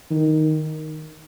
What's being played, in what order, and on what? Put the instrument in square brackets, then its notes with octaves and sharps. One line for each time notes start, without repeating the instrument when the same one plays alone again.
[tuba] D#3